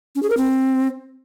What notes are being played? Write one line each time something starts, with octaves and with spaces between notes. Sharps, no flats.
C#4
G#4
A#4
C4